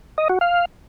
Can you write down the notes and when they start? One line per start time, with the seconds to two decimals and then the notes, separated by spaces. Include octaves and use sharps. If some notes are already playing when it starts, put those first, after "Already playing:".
0.18 D#5
0.29 F#4
0.41 F5